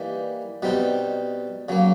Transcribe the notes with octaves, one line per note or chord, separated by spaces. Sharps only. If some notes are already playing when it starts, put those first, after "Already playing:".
Already playing: E3 G3 A#3 D#4
B2 G3 C4 D#4
C#3 F#3 A#3